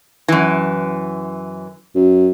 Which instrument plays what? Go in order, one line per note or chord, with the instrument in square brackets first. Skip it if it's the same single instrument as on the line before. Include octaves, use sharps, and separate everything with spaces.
[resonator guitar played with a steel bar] F#2 E3
[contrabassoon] F#2